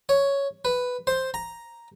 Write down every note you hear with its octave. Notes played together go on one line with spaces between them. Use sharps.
C#5
B4
C5
A#5